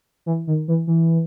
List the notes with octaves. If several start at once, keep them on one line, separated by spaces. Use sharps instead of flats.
E3
D#3
E3
E3